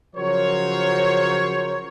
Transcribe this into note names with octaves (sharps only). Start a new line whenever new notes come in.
C#3 F3 F#3 A#4 C5 C#5